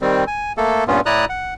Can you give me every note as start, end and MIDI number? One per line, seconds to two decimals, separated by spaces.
0.02 0.24 51
0.02 0.24 55
0.02 0.24 60
0.27 0.53 80
0.57 0.84 57
0.57 0.84 58
0.57 0.84 69
0.88 1.01 43
0.88 1.01 46
0.88 1.01 59
0.88 1.01 61
0.88 1.01 65
1.06 1.25 45
1.06 1.25 64
1.06 1.25 74
1.06 1.25 82
1.06 1.25 87
1.06 1.25 90
1.29 1.54 78